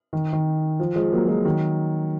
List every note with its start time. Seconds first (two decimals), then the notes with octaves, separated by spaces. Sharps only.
0.13 D#3
0.33 D#3
0.80 F3
0.96 F3 G#3
1.12 F#3 A#3
1.28 F3 G#3
1.45 D#3 F#3